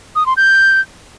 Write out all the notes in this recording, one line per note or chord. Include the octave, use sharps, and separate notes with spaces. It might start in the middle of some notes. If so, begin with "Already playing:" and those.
D#6
C6
G6